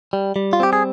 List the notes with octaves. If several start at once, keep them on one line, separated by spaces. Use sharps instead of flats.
G3
G3
F4
C4 G4
G#4